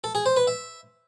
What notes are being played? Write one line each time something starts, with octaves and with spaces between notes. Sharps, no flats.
A4
G#4
C5
B4
E5